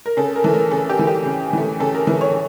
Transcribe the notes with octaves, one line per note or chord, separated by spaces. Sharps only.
A#4
C#3 A4
A#4
E3 A3 A4
A#4
C#3 A4
G4
E3 A3
G4
C#3
E3 A3
C#3 A4
A#4
E3 A3 A#4
C#5